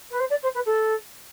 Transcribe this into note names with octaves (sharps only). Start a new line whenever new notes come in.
B4
C5
D5
C5
B4
A4